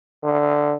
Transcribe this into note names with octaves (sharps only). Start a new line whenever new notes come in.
D3